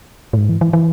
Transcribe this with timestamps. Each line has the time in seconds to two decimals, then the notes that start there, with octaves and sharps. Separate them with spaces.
0.33 A2
0.37 G#2
0.49 E3
0.61 E3
0.73 E3